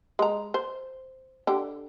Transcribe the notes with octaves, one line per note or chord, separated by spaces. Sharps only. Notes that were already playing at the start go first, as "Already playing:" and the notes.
G#3 A#5
C5
D3 G4